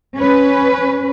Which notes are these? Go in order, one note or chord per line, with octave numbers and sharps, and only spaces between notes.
C#4 B4